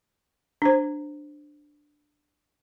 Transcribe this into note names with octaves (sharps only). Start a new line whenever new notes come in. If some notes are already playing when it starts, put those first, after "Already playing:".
D4 C5